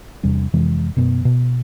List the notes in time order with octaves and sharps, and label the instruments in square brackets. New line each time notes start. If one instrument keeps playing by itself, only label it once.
[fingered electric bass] E2 C3 G3 D4
F2 C3 E3 G#3
F#2 B2 B3
B2